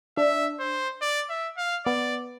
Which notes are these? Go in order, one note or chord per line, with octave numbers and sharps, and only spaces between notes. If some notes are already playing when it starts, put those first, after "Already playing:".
D4 E5
C5
D5
E5
F5
B3 D5